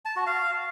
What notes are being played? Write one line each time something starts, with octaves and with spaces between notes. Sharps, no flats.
A5
F#4
F5